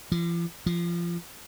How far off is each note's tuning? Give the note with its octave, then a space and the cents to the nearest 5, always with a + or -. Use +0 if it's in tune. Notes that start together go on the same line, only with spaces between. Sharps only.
F3 -45
F3 -25